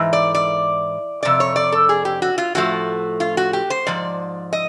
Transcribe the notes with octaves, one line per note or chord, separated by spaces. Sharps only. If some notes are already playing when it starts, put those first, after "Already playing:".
Already playing: G#2 E3
D5
D5
F2 C3 D5
C#5
D5
A4
G#4
G4
F#4
F4
A2 F3 A3 F#4
F4
F#4
G4
C5
G#2 F3 D5
D#5